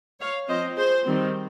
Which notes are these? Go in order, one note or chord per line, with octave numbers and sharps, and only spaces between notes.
C#5 F5
F3 C4 C5 D#5
G#4 C5
D#3 G3 C4